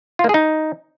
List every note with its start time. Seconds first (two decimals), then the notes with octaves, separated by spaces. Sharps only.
0.19 F4
0.24 A#3
0.29 G#4
0.34 D#4